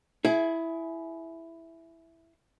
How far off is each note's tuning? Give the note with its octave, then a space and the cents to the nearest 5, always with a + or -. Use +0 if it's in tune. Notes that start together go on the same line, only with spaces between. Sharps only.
E4 +0 G#4 +25